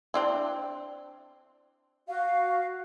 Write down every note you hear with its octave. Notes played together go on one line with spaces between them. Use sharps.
C4 D4 E4
F#4 F5